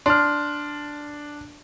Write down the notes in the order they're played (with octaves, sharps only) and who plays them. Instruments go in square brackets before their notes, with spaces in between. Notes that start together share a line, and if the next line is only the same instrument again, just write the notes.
[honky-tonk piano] D4 [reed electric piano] C6 F6